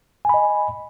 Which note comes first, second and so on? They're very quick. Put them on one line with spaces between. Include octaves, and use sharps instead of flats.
G#5 B5 D#5